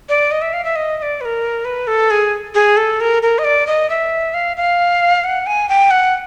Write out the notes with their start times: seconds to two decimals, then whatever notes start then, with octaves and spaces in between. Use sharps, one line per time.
0.09 D5
0.31 D#5
0.42 E5
0.53 F5
0.64 E5
0.76 D#5
0.98 D#5
1.02 D5
1.21 B4
1.25 A#4
1.65 B4
1.87 A4
2.11 G#4
2.55 G#4
2.77 A4
3.01 A#4
3.23 A#4
3.39 D#5
3.44 D5
3.67 D#5
3.90 E5
4.34 F5
4.57 F5
5.24 F#5
5.47 G#5
5.69 G5
5.91 F#5